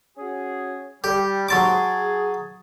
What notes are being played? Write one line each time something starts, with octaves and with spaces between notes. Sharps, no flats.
C#4 F#4 G#4
G3 G4
D#2 G#2 F#3 A5 C6 D6
G#4